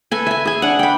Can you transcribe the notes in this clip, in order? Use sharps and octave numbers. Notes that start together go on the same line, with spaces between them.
A4 B4 G#5
E5 G#5
G#4 G#5
D4 F#5
G5 B5